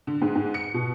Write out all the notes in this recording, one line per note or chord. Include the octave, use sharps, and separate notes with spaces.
D3
G#2
G#2
C#7
B2